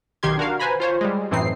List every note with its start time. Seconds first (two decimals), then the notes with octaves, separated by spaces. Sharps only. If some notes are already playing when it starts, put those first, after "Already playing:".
0.23 B1 D#3 G4 C6 G#6
0.38 D4 F#4 A#4 F5
0.59 B4 C5 G#5 A#5 B5
0.80 F4 C5 C#5
1.01 G3 G#3
1.31 F#2 A2 E3 C4 D#4 C7